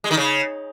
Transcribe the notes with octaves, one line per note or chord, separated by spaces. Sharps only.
G#3
D#3
C#3